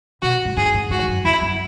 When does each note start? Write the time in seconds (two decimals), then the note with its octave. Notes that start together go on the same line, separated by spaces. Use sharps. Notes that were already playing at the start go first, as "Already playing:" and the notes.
0.22 B2 F#4
0.45 G#2
0.57 G#2 G#4
0.74 A2
0.90 G#2 F#4
1.03 E2
1.08 F#2
1.25 E2 E4
1.42 F#2